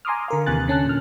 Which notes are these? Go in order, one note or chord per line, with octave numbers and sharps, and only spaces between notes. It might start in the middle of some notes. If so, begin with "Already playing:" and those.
G#5 A#5 C6 D6 D#6 F6
D3 A#4 F5
D#2 C3 E3 G#5 F#6 A6
D3 C#4 A5 F#6
A#2 F6